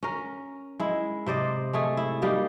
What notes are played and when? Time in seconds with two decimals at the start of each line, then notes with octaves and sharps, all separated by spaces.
0.03 C#4 A#4
0.80 G#3 E4
1.26 C3 C5 D5 D#5
1.73 G#3 A3 G#4
1.97 E4
2.22 G3 A#3 D#4 G4